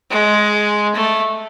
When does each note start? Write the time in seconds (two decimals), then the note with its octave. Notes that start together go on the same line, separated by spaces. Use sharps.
0.10 G#3
0.95 A3